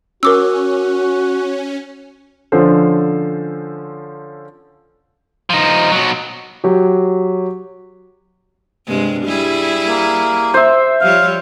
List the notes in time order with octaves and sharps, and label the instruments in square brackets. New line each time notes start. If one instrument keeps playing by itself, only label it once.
[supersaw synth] C#4 [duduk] F#4 [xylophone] A#4 D6 E6
[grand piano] D3 F3 C#4 A4 C5
[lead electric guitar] F3 D#4
B2 F#3
[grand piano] F#3 G4
[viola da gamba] G2 C3 G#3
G3 E4 G#4
[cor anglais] A#3
[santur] C5 E5
[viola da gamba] F3 G3 C#5 [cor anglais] F5